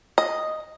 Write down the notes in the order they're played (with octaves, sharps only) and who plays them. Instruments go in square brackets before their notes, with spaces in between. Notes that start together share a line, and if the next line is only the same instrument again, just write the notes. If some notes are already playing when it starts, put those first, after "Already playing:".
[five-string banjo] D#5